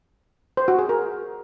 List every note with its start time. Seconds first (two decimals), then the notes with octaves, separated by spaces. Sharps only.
0.57 C5
0.68 F#4
0.79 G#4
0.89 A#4